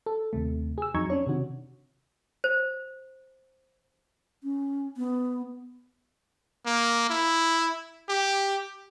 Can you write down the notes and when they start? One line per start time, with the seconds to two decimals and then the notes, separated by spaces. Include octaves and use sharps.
0.06 A4
0.33 D#2 C3 A3
0.78 G#4 E6
0.94 F2 F#3 D#4 A#5 C#6 G#6
1.10 C#4 D4 C#5
1.27 C3 D#3 F#4
2.44 C5
4.44 C#4
4.97 B3
6.66 A#3
7.10 E4
8.09 G4